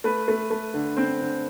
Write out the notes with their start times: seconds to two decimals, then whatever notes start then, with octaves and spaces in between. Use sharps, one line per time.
0.04 A3 B4
0.28 A3
0.51 A3
0.74 D3
0.97 D3 C4 C5
1.21 D3